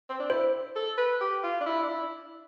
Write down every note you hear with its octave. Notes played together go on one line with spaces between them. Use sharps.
C4
D4
E4 C5
A4
B4
G4
F4
D4
E4
D4
E4